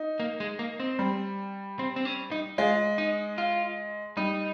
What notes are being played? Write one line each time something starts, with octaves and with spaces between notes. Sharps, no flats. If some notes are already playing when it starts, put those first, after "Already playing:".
Already playing: D#4
A#3
G#3
A#3
C4
G3
C4
C4
C#4
D#4
G#3 F4
D#4
F4
G3 D#4